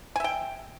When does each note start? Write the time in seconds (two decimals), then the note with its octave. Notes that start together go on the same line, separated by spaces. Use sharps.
0.16 G#5
0.20 E5
0.24 G5